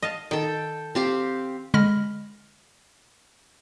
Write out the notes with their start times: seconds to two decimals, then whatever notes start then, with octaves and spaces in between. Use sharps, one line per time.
0.03 D#5 F5 A5
0.31 D#3 D#4 A4 G5
0.95 C4 G4 F5
1.74 D3 G#3 B5 F6 A#6